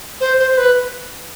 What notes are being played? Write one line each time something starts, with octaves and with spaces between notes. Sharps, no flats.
C5
C5
C5
B4